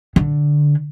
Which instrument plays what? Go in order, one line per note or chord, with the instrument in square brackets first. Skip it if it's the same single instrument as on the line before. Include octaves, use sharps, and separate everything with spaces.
[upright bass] D3